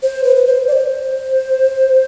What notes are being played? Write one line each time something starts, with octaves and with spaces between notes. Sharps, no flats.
C5
B4
B4
C5
D5
C5